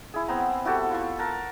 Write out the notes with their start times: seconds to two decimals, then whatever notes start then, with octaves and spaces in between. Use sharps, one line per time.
0.14 E4 G#4
0.28 B3 C4 A#5
0.65 E4 F#4 G4 A4
0.91 F4 C#6
1.19 A#4 F#5 A5